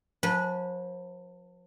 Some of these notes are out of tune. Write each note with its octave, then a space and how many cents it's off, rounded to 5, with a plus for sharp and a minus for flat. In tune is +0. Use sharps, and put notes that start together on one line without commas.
F3 +45 B4 -20 G#5 +45